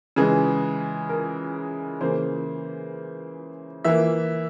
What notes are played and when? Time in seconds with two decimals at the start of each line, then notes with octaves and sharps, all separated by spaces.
0.16 C#3 E3 G#3 G#4
1.09 A#4
2.01 C#3 E3 A#3 C5
3.84 E3 A#3 E5